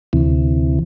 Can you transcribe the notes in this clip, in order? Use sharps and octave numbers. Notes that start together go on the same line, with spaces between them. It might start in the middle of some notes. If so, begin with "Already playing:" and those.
D2 C3 E3